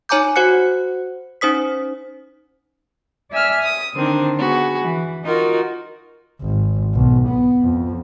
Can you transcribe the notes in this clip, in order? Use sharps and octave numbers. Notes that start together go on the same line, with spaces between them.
D#4 C#5 G#5 A#5 D6 G6
F#4 C5 F#5 F#6 C#7
C#4 D#4 C5 D#6 B6
D5 E5 G#5 E6 F6
D#6
D3 D#3 C4 D4
B3 F#4 G#4
E3
D#4 F4 F#4 A#4
G#1
B1
B3
F2